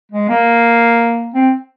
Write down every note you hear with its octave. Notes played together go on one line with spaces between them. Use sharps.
G#3
A#3
C4